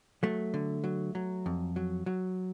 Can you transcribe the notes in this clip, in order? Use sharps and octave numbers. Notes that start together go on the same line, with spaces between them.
F#3 A3
D3
F#3
F#3
F2
F#3
F#3